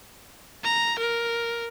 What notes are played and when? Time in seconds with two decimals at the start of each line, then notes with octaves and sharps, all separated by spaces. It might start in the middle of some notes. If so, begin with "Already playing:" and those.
0.64 A#5
0.99 A#4